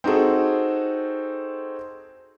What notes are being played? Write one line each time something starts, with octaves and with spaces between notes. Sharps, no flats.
C4 D#4 F#4 G#4 A4